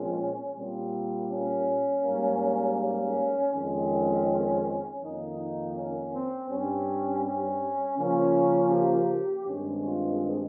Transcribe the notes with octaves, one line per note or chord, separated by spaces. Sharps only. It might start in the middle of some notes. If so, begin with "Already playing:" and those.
Already playing: A#2 F3 G#3 C4 C#4
A#2 G3 A#3 C4
C#4
G#2 G3 A#3
C#4
F2 D#3 G#3 C4 C#4
F2 D#3 A#3 D#4
D#4
C#4
C4
G2 G3 C4 C#4
C#4
C#3 F3 A#3 C#4
G4
G2 D#3 G#3 C4 C#4
F4